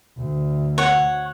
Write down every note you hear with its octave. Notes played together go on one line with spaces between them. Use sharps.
D2
C#5 F#5